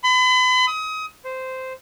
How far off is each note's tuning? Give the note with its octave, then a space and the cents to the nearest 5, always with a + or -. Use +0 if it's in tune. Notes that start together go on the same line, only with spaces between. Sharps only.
B5 +40
D#6 +30
C5 -10